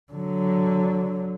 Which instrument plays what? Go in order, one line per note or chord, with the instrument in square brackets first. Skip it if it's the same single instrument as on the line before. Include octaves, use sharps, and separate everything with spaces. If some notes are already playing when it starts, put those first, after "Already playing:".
[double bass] D3 F#3